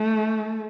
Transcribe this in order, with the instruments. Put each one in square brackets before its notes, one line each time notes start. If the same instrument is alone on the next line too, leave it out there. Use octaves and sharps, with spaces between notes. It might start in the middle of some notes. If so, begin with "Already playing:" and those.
Already playing: [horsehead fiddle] A3